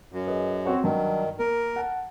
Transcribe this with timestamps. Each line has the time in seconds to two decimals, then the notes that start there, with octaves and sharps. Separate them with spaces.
0.12 F#2
0.27 G#4 B4 D#5
0.66 C4 F#4 C#5
0.83 G2 D#3 F#3 D4
1.39 A#3 A#4
1.76 F#5 A5